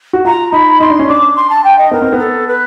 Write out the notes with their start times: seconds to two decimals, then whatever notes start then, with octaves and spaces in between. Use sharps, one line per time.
0.13 F#4
0.25 F4 A#5
0.52 D#4 B5
0.80 D#4 C6
0.90 D4
0.99 C#4
1.09 D4 D6
1.36 C6
1.49 A5
1.64 G5
1.78 D#5
1.91 B3 A#4
2.02 C4
2.13 B3
2.19 A4
2.47 B4